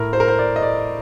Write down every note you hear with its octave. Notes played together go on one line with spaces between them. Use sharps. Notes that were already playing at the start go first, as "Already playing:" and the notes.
Already playing: A2 A#4
C5
A#4
C5
D5
D#5
D5